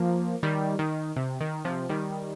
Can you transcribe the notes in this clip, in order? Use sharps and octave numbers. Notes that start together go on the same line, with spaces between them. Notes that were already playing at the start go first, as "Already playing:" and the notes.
Already playing: F3 A#3
D#3 G3
D#3
C3
D#3
C3 F3
D#3 G3